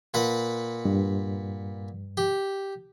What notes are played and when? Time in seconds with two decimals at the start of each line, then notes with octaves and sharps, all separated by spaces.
0.14 A#2 B4 F#5
0.85 G2
2.17 G4